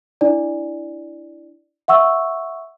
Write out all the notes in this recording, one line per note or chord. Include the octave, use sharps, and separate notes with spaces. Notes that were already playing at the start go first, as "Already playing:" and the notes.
D4 E4 D5
E5 F#5 C#6 E6